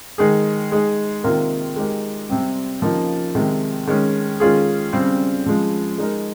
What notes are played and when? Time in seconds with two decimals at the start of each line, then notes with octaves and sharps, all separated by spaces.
0.18 D#3 G#3 D#4 G#4
0.72 G#3 D#4 G#4
1.23 C3 D#3 A#3 F4 A#4
1.76 G#3 D#4 G4 A#4
2.29 C3 G3 C4 G4
2.82 C#3 F3 A#3 D#4 G4
3.35 C3 D#3 G#3
3.87 D#3 G#3 C#4
4.40 D#3 G#3 C#4 F4 G#4
4.93 C#3 G3 C4
5.46 C#3 F3 G#3
5.98 G#3 D#4 A#4